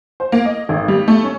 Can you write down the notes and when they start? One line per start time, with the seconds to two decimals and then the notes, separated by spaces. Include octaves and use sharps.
0.20 C5
0.32 A#3
0.45 D#5
0.69 G#1
0.88 G3
1.08 A3
1.24 C#4